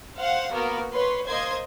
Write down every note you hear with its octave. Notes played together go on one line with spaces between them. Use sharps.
C5 F5 F#5
A#3 B3 F#4 A#4
B4 C#5 C6
A#3 C5 D#5 C6 G#6